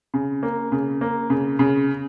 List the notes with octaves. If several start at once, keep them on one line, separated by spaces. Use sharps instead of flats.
C#3
A#3
C#3
A#3
C#3
C#3